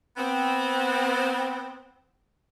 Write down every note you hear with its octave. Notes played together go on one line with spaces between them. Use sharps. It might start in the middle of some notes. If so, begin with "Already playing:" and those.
B3 C4